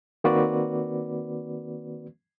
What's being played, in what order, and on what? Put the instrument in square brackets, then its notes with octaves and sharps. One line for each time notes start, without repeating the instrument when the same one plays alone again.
[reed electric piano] D#3 A#3 C4 F#4 B4 D5